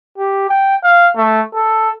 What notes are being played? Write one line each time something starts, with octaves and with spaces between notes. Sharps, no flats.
G4
G5
F5
A3
A4